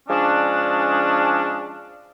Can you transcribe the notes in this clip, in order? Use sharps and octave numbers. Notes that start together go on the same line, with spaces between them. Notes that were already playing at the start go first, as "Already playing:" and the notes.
F3 G#3 C#4 D4